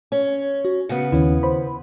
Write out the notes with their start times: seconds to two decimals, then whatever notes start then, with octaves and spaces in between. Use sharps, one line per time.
0.12 C#4
0.65 F#4
0.89 C#3 B3 C#7
1.12 D#2 D#3 C#4 E4
1.43 C5 B5